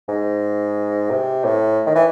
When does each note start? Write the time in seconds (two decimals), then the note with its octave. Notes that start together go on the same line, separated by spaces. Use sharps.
0.08 G#2
1.10 C3
1.44 A2
1.86 D#3
1.95 E3